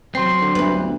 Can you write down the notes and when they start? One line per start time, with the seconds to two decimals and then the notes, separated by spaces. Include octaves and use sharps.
0.15 F#3 C4 C6 C7
0.41 D3
0.55 G1 D2 B4